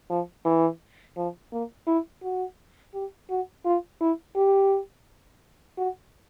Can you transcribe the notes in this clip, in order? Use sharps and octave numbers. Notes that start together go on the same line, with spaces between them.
F3
E3
F3
A#3
E4
F#4
G4
F#4
F4
E4
G4
F#4